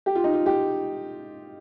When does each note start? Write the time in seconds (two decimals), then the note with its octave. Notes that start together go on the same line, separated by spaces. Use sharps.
0.06 G4
0.15 F4
0.24 D#4
0.34 F4
0.46 G4